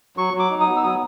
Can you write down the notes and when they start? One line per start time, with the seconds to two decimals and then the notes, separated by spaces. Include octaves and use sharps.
0.17 F#3 C#6
0.34 F#3
0.39 D6
0.50 D#4
0.61 D#6
0.66 B3
0.77 E6
0.83 F#3 D#6